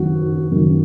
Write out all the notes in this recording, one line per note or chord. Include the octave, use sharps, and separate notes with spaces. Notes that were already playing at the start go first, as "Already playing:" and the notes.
Already playing: F#2 D#3 F#4
F#2 D#3